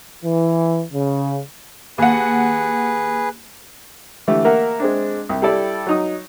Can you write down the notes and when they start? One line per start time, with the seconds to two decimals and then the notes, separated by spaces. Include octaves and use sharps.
0.24 E3
0.92 C#3
1.98 D#2 G#4 B4 F#5
4.27 D3 E3 A3 G4
4.45 A#3 A#4 E5 F#5
4.80 G#3 C4 D4
5.29 C2
5.42 G3 E4 A4 D5
5.87 F#3 D#4 D#6